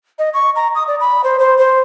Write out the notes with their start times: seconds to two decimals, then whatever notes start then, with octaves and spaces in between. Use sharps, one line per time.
0.19 D#5
0.34 C#6
0.56 A#5
0.75 D#6
0.88 D5
1.00 B5
1.24 C5
1.39 C5
1.58 C5